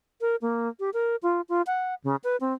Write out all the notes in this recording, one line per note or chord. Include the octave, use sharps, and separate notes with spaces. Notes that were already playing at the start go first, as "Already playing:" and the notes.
A#4
A#3
G4
A#4
F4
F4
F#5
C#3
B4
C4